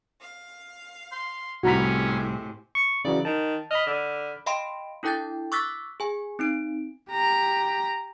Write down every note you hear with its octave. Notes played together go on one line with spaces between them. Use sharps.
F5
C6
C2 A2 C3 G#3 C#4 F#4 A#5 B5
C#6
C#3 E3 F#3 D5
D#3 A5
D#5 B5 F6
D3
D#5 F5 G5 B5 C6 D7
D4 E4 A4 G5 G6 A6
C#6 D6 E6 F#6 A6 B6
G#4 G#5
C4 D#4 D7
G4 A#5